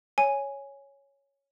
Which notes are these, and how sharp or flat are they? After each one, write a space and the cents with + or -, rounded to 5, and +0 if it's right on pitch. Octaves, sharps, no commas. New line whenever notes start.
C#5 +0 G#5 +0